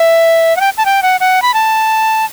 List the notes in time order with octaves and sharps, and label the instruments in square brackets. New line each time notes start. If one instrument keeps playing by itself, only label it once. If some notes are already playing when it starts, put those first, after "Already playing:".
Already playing: [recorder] E5
F#5
G5
A5
G5
F#5
F#5
B5
A5